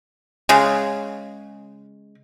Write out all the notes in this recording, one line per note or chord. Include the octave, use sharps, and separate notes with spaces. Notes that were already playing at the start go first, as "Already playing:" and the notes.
C#3 G#3